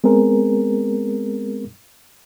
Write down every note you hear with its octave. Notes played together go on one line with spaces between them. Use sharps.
G#3 B3 C4 G#4 A#4